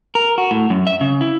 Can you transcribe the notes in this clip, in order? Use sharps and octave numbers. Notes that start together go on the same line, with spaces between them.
A#4
F#4
A2
F#2
E5
C#3
E4